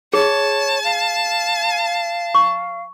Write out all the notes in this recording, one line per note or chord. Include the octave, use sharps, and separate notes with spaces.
G#4 C#5 A5
F5
C#6